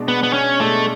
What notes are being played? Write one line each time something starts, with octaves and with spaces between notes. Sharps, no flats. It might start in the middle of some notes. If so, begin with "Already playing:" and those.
Already playing: B2 G#3 D4
B3
B3
C#4
B2 G#3 A3 D4